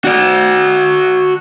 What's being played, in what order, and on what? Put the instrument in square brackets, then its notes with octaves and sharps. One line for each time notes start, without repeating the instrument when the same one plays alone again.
[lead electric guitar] F#4 D5